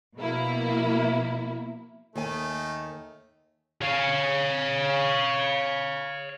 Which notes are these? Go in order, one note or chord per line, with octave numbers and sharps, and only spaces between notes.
B2 F3 A#3 E4
D#2 D#3 A3 D#4 G#5
C#5 F5